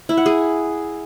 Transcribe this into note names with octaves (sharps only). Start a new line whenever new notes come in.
E4
F#5
G#4